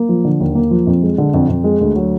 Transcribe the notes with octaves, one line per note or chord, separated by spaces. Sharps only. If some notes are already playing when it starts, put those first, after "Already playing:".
Already playing: A#3
F3
D3
D#2
A#3
F3
F2
G#3
D3
F2
F2
G#3
D2
F#3